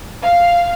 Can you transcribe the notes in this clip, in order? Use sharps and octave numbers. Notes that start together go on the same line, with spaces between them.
F5